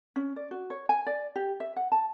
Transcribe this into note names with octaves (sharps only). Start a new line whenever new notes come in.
C#4
D5
F#4
C#5
G#5
D5
G4
E5
F#5
A5